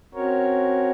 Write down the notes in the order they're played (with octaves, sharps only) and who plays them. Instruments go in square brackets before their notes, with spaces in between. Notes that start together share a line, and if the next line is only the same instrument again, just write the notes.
[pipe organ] C4 C#4 F#4 A#4 C#5